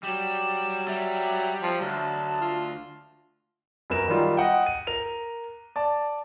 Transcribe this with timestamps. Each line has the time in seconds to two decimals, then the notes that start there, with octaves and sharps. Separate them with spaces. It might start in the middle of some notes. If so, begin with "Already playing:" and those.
0.04 F#3 G3 E7
0.88 G3 E5
1.62 F3
1.81 D2 F#3 A5
2.41 F4
3.90 F#2 B3 A#4 E7
4.08 D#3 F#3 G3 F4
4.37 D#5 F#5 G5
4.66 D#7
4.87 A#4 F7
5.76 D5 A5